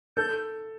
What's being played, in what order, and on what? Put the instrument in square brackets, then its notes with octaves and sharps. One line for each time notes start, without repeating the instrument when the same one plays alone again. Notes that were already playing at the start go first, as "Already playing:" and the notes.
[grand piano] A4 [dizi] G6